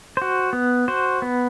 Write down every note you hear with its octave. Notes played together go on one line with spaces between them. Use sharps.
F#4 C5
B3
F#4 C5
B3